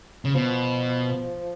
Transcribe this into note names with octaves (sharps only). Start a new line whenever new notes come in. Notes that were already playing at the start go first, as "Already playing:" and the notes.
C#3
B2 F3